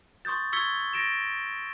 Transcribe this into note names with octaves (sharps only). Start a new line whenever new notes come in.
C6 C#6 D#6 G6 A6
C#6 E6 G#6 B6 C#7 G7
A6 A#6 D7 E7